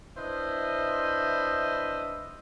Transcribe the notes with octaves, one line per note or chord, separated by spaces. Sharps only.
D4 E4 B4 C5 D#5 E5